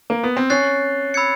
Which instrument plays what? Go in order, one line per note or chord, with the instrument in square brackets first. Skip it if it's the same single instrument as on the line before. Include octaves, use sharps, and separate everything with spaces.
[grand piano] A#3
B3
C4
[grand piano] C#4 [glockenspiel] F#6 A6 C7
[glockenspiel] B5 E6 G#6 C#7